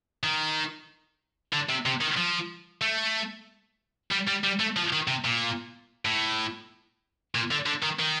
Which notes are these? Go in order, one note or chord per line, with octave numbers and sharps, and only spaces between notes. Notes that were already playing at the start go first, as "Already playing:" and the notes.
D#3
D3
C3
C3
D#3
F3
A3
G3
G3
G3
A3
F3
D#3
C3
A#2
A2
A#2
D3
D3
D#3
D#3